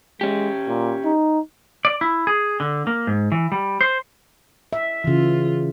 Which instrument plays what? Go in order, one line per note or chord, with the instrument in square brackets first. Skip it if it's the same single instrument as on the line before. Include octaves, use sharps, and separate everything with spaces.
[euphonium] G#3 [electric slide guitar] C#4 G4
[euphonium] A#2
D#4
[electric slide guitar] D5
E4
G#4
D3
A#3
G#2
E3
G3
C5
[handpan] E5
[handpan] C#3 E3 [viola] F4